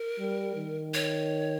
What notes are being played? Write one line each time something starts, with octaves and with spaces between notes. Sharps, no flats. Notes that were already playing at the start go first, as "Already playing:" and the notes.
Already playing: A#4
G3
D#3
C#5